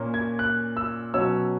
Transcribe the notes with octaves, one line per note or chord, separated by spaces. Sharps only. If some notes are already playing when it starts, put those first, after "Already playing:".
Already playing: A#2 A#3 C#4
G#6
F#6
E6
B2 F#3 C#4 E6